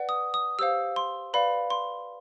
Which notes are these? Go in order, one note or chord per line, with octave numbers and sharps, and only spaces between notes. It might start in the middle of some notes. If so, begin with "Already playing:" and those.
Already playing: B4 D5 F#5
D#6
D#6
G4 C5 F5 E6
C6
B4 D5 F5 B5
C6